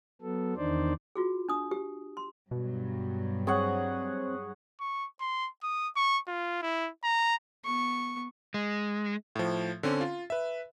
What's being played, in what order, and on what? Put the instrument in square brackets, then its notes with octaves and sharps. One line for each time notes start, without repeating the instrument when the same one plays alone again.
[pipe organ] F#3 B3 A4
E2 D#3 D4 D#4 C5 D5
[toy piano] F4 F#4 G#4
D4 D#6
G4
C6
[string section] G2 F#3 [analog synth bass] B2
[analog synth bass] C4 [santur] G#4 C#5 F#5
[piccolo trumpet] C#6
C6
D#6
C#6
F4
E4
A#5
[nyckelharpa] B3 C#6
[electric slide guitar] G#3
[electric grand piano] A2 F3
D3 C4 C#4
F4
B4 E5